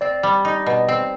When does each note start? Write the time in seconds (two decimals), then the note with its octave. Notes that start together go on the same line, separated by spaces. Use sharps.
0.01 C4 D5
0.23 G3
0.45 D#4
0.66 B2
0.88 C4